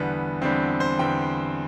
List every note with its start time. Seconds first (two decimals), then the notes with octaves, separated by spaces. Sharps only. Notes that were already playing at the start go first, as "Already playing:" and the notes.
Already playing: E2 D3 G3 B3
0.42 E2 D3 G3 C4
0.80 C5
0.99 E2 D3 G3 G5